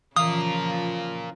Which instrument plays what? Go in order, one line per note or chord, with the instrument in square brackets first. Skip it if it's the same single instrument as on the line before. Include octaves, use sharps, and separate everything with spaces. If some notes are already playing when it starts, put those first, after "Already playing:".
[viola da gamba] C#3 F3 [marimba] E3 [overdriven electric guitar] F4 A#4 [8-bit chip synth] D#6